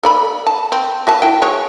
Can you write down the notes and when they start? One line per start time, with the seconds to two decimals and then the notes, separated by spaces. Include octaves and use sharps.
0.03 A4 D5 B5
0.47 A5
0.72 C4
1.07 F#4 E5 A5
1.22 E4 G5
1.42 G#3 C#5